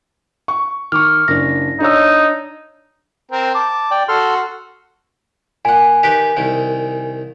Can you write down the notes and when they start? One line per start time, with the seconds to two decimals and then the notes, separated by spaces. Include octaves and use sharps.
0.48 C#6
0.92 D#3 C#6 D6 F6
1.28 F#1 D4 A#6
1.80 D4 D#4 C#5 E6
3.31 C4 A#4 G5
3.55 A5 D6
3.91 D5 G5
4.09 F#4 A4 C6 F6
5.65 A#2 F#5 G#5
6.03 D#3 G4 B4
6.37 C2 D#3